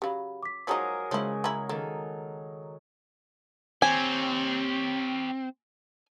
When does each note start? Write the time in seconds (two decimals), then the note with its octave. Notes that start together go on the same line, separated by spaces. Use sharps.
0.02 C#3 F#3 G4 F5 B5
0.43 D6 B6
0.67 F3 F#3 G#3 D#4 G#4 A#4
1.11 C#3 F3 G#3 E4
1.44 C#4 E4 A#5
1.69 D#3 A#3 A4
3.82 C4 G4 C#5 G#5